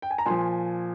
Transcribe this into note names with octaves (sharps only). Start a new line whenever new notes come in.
G5
G#5
A#5
A#2 F3 G#5 C6